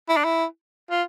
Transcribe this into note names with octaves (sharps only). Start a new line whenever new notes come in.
E4
D4
E4
F4